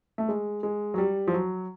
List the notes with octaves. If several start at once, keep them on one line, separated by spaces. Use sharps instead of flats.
A3
G#3
G#3
F#3
G3
F3
F#3